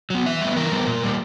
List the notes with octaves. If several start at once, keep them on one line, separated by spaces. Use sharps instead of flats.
F#3 B3
E3 E5
G3 B3
E3 A#4
G3 B3
A#2
G3 A#3